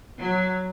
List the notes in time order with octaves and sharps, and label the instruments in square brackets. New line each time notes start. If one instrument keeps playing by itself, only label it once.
[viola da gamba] F#3